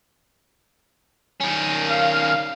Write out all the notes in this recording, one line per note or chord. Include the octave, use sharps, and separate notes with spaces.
D#3 C#4
F5